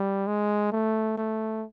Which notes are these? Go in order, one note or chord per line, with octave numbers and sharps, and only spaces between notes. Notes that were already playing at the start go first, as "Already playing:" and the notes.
Already playing: G3
G#3
A3
A3